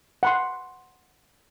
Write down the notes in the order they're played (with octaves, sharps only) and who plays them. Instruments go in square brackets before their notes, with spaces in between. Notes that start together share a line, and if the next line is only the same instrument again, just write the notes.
[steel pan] F#5 B5 C6